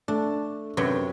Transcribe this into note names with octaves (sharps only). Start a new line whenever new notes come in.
A3 D4
F#2 C3 F#3 B4